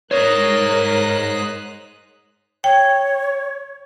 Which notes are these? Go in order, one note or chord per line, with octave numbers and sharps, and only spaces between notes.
G#2 A#4 C5 C#5 D#5 F#6
C#5 G5